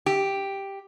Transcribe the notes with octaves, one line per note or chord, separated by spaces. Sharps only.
G4